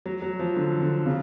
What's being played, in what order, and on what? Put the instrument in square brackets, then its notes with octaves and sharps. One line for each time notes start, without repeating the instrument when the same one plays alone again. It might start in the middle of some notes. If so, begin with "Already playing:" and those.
[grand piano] F#3
F#3
F3
D3
D3
C#3